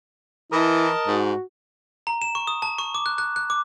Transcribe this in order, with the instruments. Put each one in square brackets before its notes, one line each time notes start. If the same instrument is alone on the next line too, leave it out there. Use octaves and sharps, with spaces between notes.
[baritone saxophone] E3 [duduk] E4 [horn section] A#4 D#5 A5
[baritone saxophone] G#2 [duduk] F#4
[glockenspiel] A#5
E7
C#6
D#6
A5
C#6
D6
F#6
F#6
F#6
D6